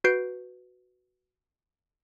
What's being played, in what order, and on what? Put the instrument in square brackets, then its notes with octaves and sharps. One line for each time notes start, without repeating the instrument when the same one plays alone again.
[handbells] F#4 B4 G6 C7 D7